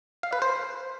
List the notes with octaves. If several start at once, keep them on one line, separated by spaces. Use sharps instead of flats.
F5
B4
C5